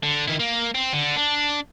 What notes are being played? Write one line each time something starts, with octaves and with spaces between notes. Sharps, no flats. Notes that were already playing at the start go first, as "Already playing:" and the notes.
D3
D#3 E4
A#3
C4
D3
D4